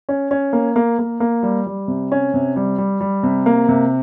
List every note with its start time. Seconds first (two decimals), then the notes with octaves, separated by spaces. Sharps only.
0.09 C#4
0.31 C#4
0.53 A#3
0.76 A#3
0.99 A#3
1.20 A#3
1.43 G3
1.67 G3
1.88 C3
2.12 C#4
2.34 C3
2.56 G3
2.78 G3
3.01 G3
3.23 C3
3.46 A#3
3.69 C3